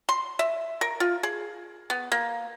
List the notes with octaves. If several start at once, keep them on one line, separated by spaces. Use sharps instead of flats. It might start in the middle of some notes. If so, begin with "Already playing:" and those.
C6
E5
A#4
F4
G#4
B3
A#3